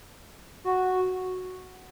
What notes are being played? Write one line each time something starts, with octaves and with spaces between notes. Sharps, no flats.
F#4